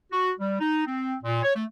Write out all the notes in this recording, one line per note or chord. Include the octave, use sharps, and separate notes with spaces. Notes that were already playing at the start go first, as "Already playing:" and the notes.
F#4
G3
D#4
C4
A#2
C#5
A3